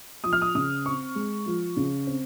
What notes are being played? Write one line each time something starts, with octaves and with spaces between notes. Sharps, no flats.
F3 D#6
F6
D#6
C#3 D#6
C4 C#6
G#3
F3
C#3
C4